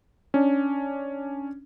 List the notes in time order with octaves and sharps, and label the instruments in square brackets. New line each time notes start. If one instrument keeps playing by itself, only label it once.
[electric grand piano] C#4 D4